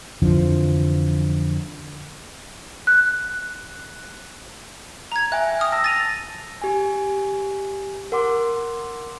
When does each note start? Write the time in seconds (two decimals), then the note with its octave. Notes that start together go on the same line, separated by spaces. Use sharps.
0.22 F2 D3 E3 F3
2.87 F#6
5.12 A#5 G#6
5.32 E5 G5 G#5 F#6
5.59 D#6 F6
5.72 A5 E6 A#6
5.84 A6 D#7 F7
6.62 G4 G#5
8.12 A#4 F#5 C6 D6